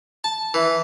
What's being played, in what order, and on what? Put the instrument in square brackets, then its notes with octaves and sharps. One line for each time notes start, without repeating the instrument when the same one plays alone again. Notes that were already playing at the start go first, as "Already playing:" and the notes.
[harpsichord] A5
E3